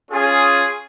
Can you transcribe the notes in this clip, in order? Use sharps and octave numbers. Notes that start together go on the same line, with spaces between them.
C#4 F4 G#4